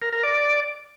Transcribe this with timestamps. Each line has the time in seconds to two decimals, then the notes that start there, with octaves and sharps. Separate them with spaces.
0.02 A#4
0.13 A#4
0.23 D5